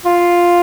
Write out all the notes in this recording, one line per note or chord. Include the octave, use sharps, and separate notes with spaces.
F4